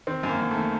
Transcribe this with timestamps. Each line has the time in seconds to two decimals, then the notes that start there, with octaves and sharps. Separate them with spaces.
0.07 D#3 C4
0.23 F#2
0.29 A#3
0.41 F#2
0.51 A3
0.56 D#3